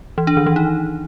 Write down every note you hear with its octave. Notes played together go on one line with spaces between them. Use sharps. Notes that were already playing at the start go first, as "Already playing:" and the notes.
E3
D4
D#3
E3
D#4